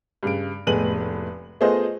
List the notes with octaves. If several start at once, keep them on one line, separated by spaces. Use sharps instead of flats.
G2 C#3 D7
F1 A2 G#3 B3 D#7 F#7
A3 B3 F4 G#4 C5 D#5